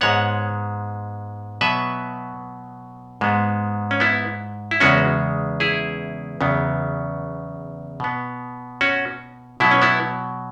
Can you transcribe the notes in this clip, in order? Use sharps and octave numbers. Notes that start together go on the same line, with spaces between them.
G#2 G#3 B3 C#5 F#5
B2 F#3 B3 B4 E5
G#2 G#3 B3
C#4
B3 E4
E4
E2 C#3 G#3 B3 C#4 F#4
E4 G#4
E2 C#3 F#3 B3
B2 B3
C#4 F#4
B2 F#3 B3 E4
C#4
B3 E4